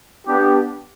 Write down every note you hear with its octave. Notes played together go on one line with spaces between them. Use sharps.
B3 D4 G4